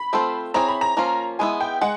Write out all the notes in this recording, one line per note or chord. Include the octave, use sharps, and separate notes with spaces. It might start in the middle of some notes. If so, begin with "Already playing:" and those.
Already playing: B5
A3 C4 F4 A4 C5
C4 E4 G#4 C#5 A#5
B5
A#5
F3 A#3 C#4 F4
G#3 B3 E4 G#5
G5
G#3 F#5